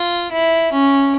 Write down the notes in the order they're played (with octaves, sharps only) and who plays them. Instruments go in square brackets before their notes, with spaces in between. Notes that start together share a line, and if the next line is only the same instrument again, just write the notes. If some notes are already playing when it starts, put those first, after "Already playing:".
Already playing: [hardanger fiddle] F4
E4
C#4